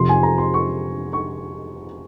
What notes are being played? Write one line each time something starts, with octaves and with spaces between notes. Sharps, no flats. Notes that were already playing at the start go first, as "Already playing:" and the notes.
Already playing: F2 C3 F3 C6
G#5
A#5
C6
C#6
C#6